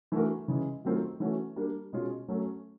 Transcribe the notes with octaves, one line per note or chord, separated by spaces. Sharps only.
E3 A3 D4 F#4 A#4
C#3 E3 G#3
D#3 F#3 A3 C4 F4
E3 A3 C#4 F#4
G3 A#3 D4
B2 G#3 C#4 F4
F#3 A3 C#4